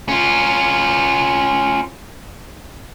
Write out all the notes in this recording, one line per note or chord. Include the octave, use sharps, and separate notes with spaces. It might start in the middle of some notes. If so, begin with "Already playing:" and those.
C#4 F4